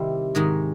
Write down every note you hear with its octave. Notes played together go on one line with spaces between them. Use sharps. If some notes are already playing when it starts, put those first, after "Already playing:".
Already playing: C3 D#3 G3 C4 E4
G#2 D#3 G#3